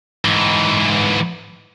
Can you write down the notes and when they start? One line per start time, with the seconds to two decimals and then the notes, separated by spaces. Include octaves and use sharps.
0.25 G#2 E3